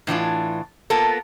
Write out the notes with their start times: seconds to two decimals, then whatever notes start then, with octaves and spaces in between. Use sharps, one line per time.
0.07 A2 E3 D4 F4
0.90 A#3 B3 F4 A4 A#4